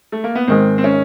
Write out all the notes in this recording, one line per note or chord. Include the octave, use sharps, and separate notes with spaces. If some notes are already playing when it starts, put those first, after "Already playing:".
A3
A#3
B3
G#2 D#3 G#3 C4
C4
C#4